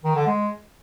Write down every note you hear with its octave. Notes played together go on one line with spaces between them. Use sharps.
D#3
D3
G#3